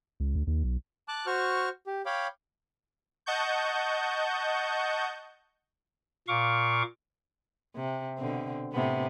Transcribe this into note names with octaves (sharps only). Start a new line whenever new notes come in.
C#2
D2
D#2
B1
A5 D6 F#6
F#4 C5 C#6 F6
G4
C#5 F5 G5 B5 D6
D#5 F#5 A5 C#6 G6
A#2 F5 C#6 D6
C3
B2 D3 C4
A2 C3 B3